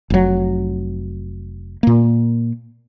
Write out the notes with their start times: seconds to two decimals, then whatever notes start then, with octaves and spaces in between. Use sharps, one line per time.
0.10 F1 F#3
1.83 A#2 A#3